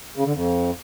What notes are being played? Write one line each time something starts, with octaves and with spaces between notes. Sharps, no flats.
C#3
D3
F2